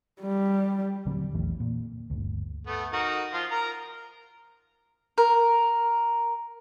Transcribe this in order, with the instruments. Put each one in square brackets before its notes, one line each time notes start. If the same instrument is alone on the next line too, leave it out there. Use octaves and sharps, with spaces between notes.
[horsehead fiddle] G3
[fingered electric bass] D#1 D3 F#3 C4
A#1 E2 E3 A3
A#2
G1 D2
[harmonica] A3 B3
D#4 F#4 A#4
F3 F4
A#4 A#5
[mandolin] A#4